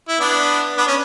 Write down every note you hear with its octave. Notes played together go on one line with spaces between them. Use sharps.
E4
B3 D4
B3 D4
C#4